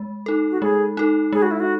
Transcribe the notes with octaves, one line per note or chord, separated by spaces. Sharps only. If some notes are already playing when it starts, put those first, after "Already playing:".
Already playing: G#3
D#4 A4
F#4
G#3 G#4
D#4 A4
G#3 G#4
F#4
E4
F#4